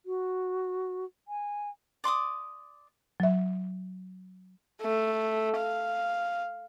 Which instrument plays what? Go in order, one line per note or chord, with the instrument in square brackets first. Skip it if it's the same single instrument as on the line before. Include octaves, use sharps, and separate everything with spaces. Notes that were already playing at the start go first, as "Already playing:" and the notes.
[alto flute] F#4
G#5
[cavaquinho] D5 C6 D6 D#6
[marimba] F#3 E5
[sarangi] A3
F5